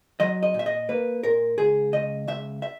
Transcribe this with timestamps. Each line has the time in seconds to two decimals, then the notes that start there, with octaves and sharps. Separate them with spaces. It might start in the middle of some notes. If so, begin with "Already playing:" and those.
0.20 F#3 D#5
0.43 D#5
0.54 A#2
0.59 E5
0.66 D#5
0.89 A#3 B4
1.23 A#2 A#4
1.58 C#2 G#4
1.93 C#2 D#5
2.28 C#2 E5
2.62 E5